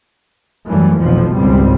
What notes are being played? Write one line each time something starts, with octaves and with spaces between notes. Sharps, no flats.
F#2 E3 G3 A3
F1 B1 F2 B2 E3 F3
G#1 C#2 G#2 G3 C4